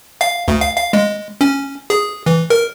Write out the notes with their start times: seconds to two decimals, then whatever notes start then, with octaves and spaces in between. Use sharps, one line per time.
0.21 F5
0.48 D2
0.61 F5
0.76 F5
0.93 G#3
1.41 C#4
1.90 G#4
2.26 E3
2.50 A#4